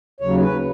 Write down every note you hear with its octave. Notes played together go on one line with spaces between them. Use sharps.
D#2 C#3 F#3 C#5
B4